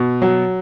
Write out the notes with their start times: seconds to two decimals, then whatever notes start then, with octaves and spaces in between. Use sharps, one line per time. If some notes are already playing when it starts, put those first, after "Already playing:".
Already playing: B2
0.22 F#3